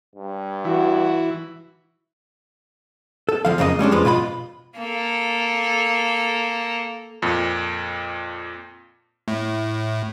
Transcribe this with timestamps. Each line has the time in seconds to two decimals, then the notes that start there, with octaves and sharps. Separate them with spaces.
0.16 G2
0.65 E3 F#4
3.29 A4
3.45 D2 F3 F5
3.58 F2 C#3 A#3 A#4 D#5
3.79 G3 G#3 C#4 D4
3.91 F2 F3 G#3 B4
4.05 B2 F4 A#4 B5
4.78 A#3 A4
7.22 F2 A#2
9.28 A2